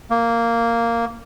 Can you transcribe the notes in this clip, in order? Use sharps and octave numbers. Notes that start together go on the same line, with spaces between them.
A#3